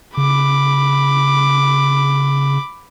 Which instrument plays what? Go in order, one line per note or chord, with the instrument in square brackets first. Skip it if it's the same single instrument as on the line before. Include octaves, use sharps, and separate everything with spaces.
[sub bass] C#3 [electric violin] B5 D6